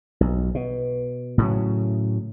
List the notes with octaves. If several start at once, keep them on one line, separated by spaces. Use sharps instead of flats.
B1
B2
A2 C#3 F#3